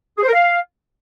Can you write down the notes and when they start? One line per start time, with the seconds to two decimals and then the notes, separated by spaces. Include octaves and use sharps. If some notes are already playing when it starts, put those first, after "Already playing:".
0.18 G#4
0.23 C5
0.28 A#4
0.33 F5